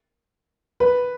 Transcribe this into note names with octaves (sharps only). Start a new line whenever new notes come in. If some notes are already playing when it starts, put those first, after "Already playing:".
B4